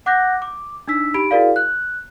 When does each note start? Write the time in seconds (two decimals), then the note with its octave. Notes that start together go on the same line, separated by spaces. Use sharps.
0.06 F#5 D6 F#6 G6 A#6
0.42 D6
0.88 D4 D#4 E6 B6
1.14 D#4 G4 B5 D7
1.31 E4 F#4 G#4 A#4 D5 F5
1.56 F#6